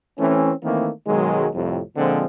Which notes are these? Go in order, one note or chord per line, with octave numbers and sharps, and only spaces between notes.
E3 A3 C4 C#4
D#3 E3 A3 A#3 C4
B1 D#3 F#3 G#3
C2 F2 A2 C3
A#2 D3 F3 G#3 C4